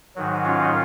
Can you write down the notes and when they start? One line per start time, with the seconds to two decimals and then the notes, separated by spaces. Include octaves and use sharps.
0.16 G#2 D#3 F#3
0.45 C#4 F4